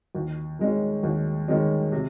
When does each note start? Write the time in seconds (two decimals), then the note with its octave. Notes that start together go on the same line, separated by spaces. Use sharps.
0.15 D#2
0.59 D#3 G#3 C#4
1.03 D#2
1.48 D#3 G#3 C#4
1.92 C3